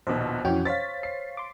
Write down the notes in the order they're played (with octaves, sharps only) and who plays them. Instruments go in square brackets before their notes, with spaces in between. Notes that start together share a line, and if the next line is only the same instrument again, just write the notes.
[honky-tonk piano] A#1 D#2 B2 [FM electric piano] C5
[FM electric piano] F2 F#4 G5 [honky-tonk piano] E3 C#4
[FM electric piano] C5 C#5 F5 [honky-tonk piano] A6 B6
[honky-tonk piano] C7
[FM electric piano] C6 D6